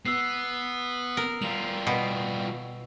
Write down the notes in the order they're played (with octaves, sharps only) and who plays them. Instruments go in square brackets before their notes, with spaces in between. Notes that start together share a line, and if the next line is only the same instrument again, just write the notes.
[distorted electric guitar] B3 [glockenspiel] E6 C7
[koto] A#4
[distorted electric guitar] G3 F4 [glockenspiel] F7 F#7
[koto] B2